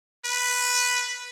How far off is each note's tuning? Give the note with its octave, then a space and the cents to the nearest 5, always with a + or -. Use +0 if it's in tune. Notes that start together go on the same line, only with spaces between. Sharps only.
B4 +0